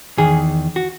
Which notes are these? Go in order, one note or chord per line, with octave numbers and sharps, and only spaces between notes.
E2 D#3 G#4
F#4